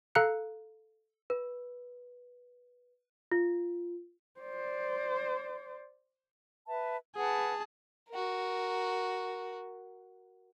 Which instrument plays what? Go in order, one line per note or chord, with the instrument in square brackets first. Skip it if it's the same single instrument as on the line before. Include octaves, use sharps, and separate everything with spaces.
[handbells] A4 F5 A#5 F#6 C#7
[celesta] B4
F4
[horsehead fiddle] C5 D5
[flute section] B4 E5 A5
[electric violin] G#4 A5 [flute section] B4 F#5
[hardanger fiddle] F#4 A#4